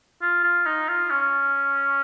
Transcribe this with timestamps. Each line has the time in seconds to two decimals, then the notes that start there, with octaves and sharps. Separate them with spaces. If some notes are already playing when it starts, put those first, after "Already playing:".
0.22 F4
0.44 F4
0.66 D#4
0.88 F4
1.11 C#4